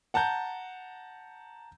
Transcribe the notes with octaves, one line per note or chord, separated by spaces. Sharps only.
F#5 A5 A#5 G6